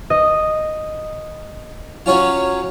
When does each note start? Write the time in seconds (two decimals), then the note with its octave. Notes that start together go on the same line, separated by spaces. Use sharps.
0.10 D#5
2.06 F#3 C#4 F4